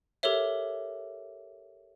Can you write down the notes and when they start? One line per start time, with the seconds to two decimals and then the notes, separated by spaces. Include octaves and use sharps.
0.23 G4 A4 A#4 C#5 E5